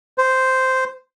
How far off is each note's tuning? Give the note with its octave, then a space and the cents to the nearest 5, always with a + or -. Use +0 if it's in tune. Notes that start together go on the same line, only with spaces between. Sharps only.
C5 -5